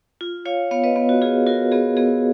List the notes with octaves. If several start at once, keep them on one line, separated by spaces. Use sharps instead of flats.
F4
F4 C#5 F5
B3 C#5 F5
B4 D#5
B3
F#4
F4 G#4
F4 F#4 A#4
B3 G#4
B3 G#4